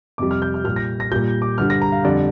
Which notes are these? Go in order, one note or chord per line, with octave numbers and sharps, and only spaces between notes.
F2 C3 G3 D6
F6
G6
F6
A#2 G3 F6
A#6
A#6
A#2 G3 G6
D6
G2 D3 G3 F6
A#6
A#5
F5
F2 D3 G3 D5